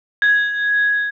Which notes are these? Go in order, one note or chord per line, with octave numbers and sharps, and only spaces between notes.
G#6